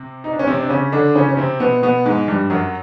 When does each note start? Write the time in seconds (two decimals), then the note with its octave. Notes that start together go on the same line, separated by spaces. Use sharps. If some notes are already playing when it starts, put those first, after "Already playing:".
Already playing: C3 C4
0.24 D#4
0.32 D4
0.39 C#4
0.47 C3 C4
0.60 D4
0.69 C#3 C#4
0.92 D3 D4
1.15 C#3 C#4
1.29 C#4
1.37 C3 C4
1.60 B2 B3
1.82 B2 B3
2.06 G#2 G#3
2.28 G2 G3
2.50 F#2 F#3